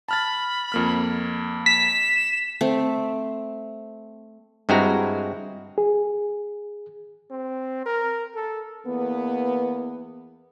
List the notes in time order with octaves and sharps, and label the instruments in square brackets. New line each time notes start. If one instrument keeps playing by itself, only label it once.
[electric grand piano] A5 F6 A6 [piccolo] B5
[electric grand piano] F2 A#3 F6
[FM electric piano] B6 [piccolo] E7
[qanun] A3 C4
[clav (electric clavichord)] G2 G#3 C4 E4 F#4 A#5
[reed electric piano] G#4
[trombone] C4
A#4
A4
[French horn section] E2 A#3 B3